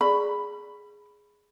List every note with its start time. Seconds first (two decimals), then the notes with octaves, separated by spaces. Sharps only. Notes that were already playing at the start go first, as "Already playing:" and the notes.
0.01 G#4 D5 B5 C#6